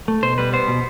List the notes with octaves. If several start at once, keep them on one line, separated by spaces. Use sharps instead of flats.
A3
B2 C5
G3 B4
B3 C5
B2